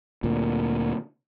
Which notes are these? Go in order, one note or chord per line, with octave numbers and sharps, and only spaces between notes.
D2 A#2